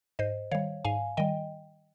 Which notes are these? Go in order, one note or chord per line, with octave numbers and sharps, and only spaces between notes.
G#2 C5 D#5
D#3 G3 C#5 F5
G#2 F5 G#5
D#3 G3 D#5 G5